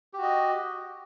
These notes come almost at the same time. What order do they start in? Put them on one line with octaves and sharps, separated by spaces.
G4 F#4 D#5